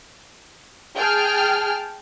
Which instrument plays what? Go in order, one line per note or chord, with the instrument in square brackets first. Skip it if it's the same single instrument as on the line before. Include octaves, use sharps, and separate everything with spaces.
[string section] G#4 G5 A5 F6